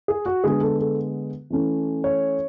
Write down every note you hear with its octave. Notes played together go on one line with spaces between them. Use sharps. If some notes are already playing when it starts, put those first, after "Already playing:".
G#4
F#4
D3 G#3 B3 G#4
A4
A4
E3 A3 C#4
C#5